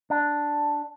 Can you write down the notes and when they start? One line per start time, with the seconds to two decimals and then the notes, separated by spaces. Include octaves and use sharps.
0.10 D4